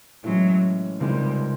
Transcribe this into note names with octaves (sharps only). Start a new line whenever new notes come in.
A2 E3 F#3 G#3 C#4
C#2 C3 D#3 G3 G#3 C4